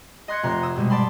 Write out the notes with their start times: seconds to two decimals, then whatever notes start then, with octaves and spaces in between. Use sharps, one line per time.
0.28 D#5 C6 F#6 G#6 C#7
0.43 F1 C3 A#5 C6
0.63 D#6 E6
0.76 G2 B2 G3 G#3
0.90 D5 A5 B5 C6